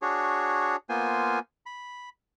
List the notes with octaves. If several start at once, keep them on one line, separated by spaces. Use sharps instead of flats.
D4 F#4 G#4 C#5
A#3 B3 F4 C5 G#5
B5